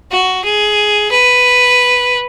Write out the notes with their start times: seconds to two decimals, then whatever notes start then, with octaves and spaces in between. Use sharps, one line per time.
0.11 F#4
0.45 G#4
1.11 B4